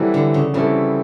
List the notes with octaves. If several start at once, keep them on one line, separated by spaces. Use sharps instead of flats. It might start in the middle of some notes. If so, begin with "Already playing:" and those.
Already playing: E3 F#3 G3 C4 E4 A4
D3
C#3
C#3 E3 G3 C4 E4 A4